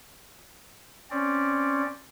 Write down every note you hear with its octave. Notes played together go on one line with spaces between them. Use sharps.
C4 C#4 D5